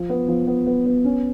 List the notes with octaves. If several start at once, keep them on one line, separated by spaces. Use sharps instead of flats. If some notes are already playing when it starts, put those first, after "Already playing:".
Already playing: F3
B3
F3
B3
B3
B3
C#4